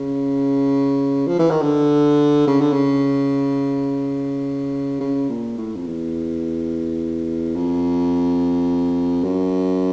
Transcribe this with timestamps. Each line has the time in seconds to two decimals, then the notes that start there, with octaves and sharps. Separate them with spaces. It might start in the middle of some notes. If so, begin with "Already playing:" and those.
Already playing: C#3
1.27 F3
1.39 E3
1.50 D#3
1.62 D3
2.47 C#3
2.61 D3
2.73 C#3
5.00 C#3
5.29 A#2
5.58 A2
5.76 F2
5.86 E2
7.55 F2
9.24 F#2